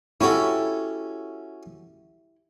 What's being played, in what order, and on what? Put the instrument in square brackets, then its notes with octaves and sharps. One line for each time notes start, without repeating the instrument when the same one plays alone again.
[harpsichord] C#4 F#4 A4 [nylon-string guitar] E4 G4